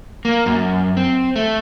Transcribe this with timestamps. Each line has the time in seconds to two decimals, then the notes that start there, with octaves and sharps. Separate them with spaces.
0.25 A#3
0.46 F#2
0.97 C4
1.36 A3